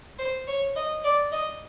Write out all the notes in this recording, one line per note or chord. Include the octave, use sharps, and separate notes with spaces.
C5
C#5
D#5
D5
D#5